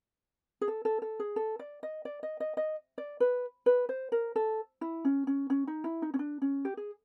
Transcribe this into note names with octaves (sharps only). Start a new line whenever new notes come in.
G#4
A4
A4
A4
G#4
A4
D5
D#5
D5
D#5
D#5
D#5
D5
B4
B4
C5
A#4
A4
E4
C#4
C#4
C#4
D#4
E4
D#4
C#4
D4
C#4
G4
G#4